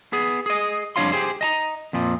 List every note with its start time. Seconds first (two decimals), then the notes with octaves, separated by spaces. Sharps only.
0.13 B3 G#4
0.46 G#4 D#5
0.96 F2 G3 D4 C#5 F5 C6
1.12 G4 G#4 C5
1.41 D#5 A5 A#5
1.93 F2 A#2 F3